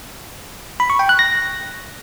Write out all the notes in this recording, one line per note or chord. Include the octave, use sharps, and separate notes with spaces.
B5
C#6
G5
F#6
A#6